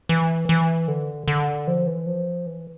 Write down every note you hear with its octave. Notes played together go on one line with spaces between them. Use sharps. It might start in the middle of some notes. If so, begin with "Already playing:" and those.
E3
E3
D3
D3
F3
E3
F3
E3